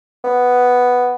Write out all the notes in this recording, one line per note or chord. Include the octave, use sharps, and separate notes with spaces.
B3